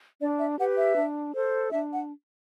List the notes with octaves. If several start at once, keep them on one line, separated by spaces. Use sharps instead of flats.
D4 D5
E5
G4 B4 F#5
E5
D4
A4 C5
D4 E5
F#5